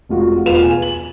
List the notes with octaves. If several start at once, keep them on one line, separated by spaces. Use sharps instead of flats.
F1 G#3 F4 F#4
E1 F4 B4 E7 F7
G#5
F#7